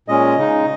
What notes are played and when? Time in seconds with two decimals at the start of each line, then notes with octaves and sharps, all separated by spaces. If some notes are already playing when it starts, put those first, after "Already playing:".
0.08 A#2 G#3 C#4 D#5
0.37 C#3 G#3 D#4